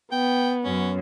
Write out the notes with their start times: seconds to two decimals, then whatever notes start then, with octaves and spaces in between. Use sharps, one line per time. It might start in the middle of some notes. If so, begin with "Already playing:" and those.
0.12 B3 G5
0.65 F#2 C#4